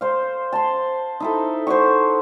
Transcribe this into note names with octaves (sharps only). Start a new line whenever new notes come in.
C5 F5
A5 C6
D#4 E4 A4
C5 F#5 C#6